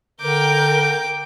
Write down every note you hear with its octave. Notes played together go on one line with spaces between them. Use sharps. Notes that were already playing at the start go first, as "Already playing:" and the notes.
D3 A#4 G5 D6 G6